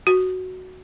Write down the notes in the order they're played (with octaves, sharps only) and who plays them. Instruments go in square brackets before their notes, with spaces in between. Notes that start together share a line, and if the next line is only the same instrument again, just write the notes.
[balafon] F#4